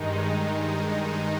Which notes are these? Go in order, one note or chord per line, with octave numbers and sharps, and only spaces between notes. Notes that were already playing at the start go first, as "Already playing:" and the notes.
Already playing: G2 D#3 G#3 D#4
D#4